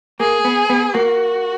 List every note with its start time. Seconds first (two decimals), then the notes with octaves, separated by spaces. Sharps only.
0.20 A#3 G#4
0.45 B3
0.70 B3
0.94 A#3 F#4